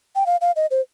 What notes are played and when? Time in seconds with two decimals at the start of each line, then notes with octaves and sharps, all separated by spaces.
0.15 G5
0.26 F5
0.41 F5
0.56 D#5
0.71 C5